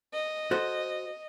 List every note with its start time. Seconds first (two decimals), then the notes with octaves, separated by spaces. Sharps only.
0.14 D#5
0.51 F#4 A4 C5